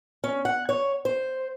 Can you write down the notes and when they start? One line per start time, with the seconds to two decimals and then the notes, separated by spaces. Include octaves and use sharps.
0.24 C#4
0.45 F#5
0.69 C#5
1.05 C5